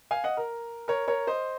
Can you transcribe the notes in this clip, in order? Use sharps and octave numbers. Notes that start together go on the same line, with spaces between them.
F5 G#5
D#5 F#5
A#4
A#4 C#5
A#4 C#5
C5 D#5